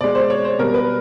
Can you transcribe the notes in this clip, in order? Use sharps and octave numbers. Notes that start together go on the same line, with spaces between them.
B2 G#3 D5
C5
C#5
C5
B2 G3 A#4
B4